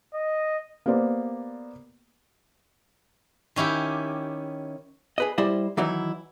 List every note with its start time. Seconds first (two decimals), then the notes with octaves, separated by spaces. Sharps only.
0.14 D#5
0.86 A#3 B3 G4 C5 D5
3.56 D#3 C#4 E4 G4
5.18 G#4 B4 D#5
5.38 G3 E4 C5 D#5
5.77 D#3 E3 F#3 D#4 E4